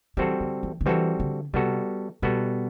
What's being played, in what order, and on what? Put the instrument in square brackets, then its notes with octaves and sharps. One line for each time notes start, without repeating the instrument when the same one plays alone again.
[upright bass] E3 [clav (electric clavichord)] G3 C4 F#4 A4
[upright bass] D3
E3
D3
[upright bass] E3 [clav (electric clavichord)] G3 C4 F#4 A4
[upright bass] D3
[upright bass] C3 [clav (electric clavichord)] G3 B3 F#4 A4
[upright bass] B2 [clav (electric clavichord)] G3 B3 F#4 A4